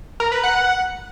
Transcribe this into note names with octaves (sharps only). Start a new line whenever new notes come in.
A#4
B4
F#5